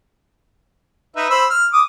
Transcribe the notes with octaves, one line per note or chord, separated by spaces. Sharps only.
D#4 B4 E5
C5 B5 E6
F6
D6 D#6